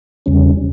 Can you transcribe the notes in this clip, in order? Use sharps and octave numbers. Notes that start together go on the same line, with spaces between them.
E2 C#3 G3 C#4